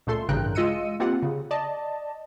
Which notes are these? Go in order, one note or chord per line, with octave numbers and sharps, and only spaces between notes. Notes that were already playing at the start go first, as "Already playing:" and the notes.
C#2 A#2 A3 A4 C6
A1 G2 C#3 A#4 G5 F#6
G#3 F4 D#5 E6 C#7 D#7
A#3 C4 F4 G4 F#5
C#3
D5 D#5 A5